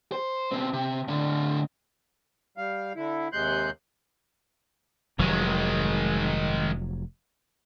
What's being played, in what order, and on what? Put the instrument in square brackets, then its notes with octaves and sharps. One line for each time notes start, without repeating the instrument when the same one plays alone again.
[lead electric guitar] C5
B2 C4
C3
A2 D3
[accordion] G3 F5
D3 E4
D#2 C3 G#3 C6 F#6 G6
[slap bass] F1 F#3 [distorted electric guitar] D#3 G#3